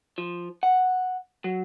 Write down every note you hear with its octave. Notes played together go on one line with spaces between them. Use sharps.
F3
F#5
F#3